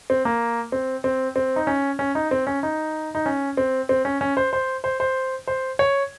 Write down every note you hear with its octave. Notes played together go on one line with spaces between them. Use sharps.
C4
A#3
C4
C4
C4
D#4
C#4
C#4
D#4
C4
C#4
D#4
D#4
C#4
C4
C4
C#4
C#4
C5
C5
C5
C5
C5
C#5